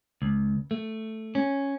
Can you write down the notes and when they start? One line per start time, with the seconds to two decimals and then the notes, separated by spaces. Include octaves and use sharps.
0.22 C#2
0.71 A3
1.35 C#4